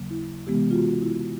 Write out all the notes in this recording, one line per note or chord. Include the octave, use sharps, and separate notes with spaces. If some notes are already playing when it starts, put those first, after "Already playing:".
Already playing: D#2 C#3 F#3 A#3
E4
C3 E3 G#3 B3 G4
F4
F#4
E4